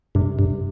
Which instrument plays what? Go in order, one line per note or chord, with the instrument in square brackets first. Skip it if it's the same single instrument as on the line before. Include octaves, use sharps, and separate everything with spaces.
[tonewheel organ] G2 [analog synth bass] C3
[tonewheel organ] G2